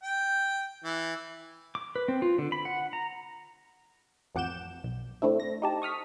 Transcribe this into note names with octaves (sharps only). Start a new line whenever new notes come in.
G5
E3
D6
B4
C4
F4
D3
B5
F#5
A#5
A1 F2 F#5 D6 G6 E7
B1
A3 C4 D4 E4
A#6
D#4 G4 A5
C#6 D#6 F6 B6